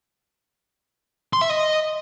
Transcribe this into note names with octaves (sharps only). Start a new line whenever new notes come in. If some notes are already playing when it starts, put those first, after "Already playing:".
C6
E5
D#5